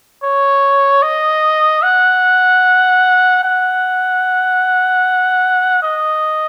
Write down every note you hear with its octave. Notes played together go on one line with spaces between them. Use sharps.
C#5
D#5
F#5
F#5
D#5